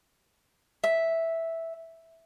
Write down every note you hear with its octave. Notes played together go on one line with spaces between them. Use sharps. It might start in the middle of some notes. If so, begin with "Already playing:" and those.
E5